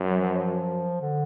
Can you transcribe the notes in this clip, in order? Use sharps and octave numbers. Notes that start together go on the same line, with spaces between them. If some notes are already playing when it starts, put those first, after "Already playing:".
Already playing: F#2
F#3
F3
D3